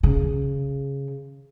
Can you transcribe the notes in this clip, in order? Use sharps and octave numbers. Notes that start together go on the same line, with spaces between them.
C#3